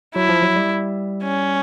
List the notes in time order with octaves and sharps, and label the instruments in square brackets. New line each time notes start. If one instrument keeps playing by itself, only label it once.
[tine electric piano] F#3 [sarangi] E4
[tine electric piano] F3
F#3
G3
[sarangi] C#4